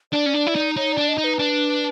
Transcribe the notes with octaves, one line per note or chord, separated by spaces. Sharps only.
D4 D5
C#4
D4
E4
D#4
D#4 C#5
D4 D5
D#5
D#4
B4
D4